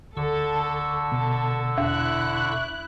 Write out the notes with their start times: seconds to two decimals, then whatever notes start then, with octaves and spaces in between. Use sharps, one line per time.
0.17 D2 D3 A4 C#6 E6
1.12 B2 A4
1.78 E2 E4 F#6